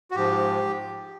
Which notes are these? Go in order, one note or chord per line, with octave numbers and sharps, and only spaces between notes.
F#4
G#2 F3 G4